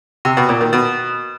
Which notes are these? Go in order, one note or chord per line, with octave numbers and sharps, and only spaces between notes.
C3
B2
A#2
D#3
B2